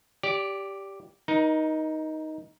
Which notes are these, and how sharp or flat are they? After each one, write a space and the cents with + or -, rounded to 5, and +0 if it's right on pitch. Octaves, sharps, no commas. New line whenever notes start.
G4 +0 D5 -25
D#4 +5 A#4 +35